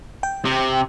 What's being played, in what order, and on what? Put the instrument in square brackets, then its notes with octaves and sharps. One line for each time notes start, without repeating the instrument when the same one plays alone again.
[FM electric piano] G5
[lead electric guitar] C3